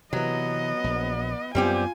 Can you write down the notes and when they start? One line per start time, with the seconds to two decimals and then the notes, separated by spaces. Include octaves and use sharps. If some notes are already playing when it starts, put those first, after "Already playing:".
0.13 C3 E3 F#3 B3 D#5
0.84 A#1
1.55 F#2 G3 B3 C4 F4 G4 G#5